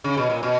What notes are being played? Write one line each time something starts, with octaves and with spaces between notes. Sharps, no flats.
C#3
B2
A#2
B2